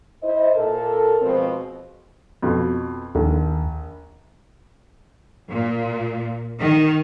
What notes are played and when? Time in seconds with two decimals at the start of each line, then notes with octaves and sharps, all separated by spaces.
0.23 E4 C5 D#5
0.55 A#2 A4 A#4
1.22 B2 F3 G#3 C4
2.42 F2 B2
3.15 A#1 D#2
5.50 A#2
6.58 D#3